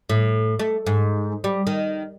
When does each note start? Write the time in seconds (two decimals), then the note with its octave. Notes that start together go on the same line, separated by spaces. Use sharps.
0.09 A2
0.59 A3
0.86 G#2
1.44 G3
1.67 D#3